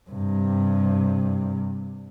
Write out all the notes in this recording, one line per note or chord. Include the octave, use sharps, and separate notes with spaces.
G2 C3